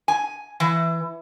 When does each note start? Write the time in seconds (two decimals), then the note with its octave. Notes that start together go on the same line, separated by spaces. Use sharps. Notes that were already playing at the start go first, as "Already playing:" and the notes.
0.08 G#5
0.60 E3